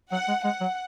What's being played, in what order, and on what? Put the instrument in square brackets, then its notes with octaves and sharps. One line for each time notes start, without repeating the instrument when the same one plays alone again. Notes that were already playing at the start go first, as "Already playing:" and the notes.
[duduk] F#3 [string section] F#5
[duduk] G#3
[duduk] G#3 [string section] F#5
[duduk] F#3